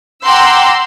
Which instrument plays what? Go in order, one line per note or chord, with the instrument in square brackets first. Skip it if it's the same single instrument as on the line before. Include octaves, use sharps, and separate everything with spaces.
[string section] F#5 G5 A#5 C6 D6 E6